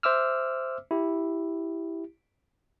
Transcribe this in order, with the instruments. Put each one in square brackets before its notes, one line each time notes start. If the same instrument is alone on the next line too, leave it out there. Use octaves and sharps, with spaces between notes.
[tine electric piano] C5 E5 D6 E6 F6
E4 G4